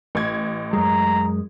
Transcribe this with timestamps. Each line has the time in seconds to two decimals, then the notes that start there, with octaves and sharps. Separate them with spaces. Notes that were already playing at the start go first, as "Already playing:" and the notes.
0.15 A1 G#6
0.73 F#2 G#3 A#5